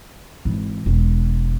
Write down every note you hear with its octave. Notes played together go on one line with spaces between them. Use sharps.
G#1 E3
E1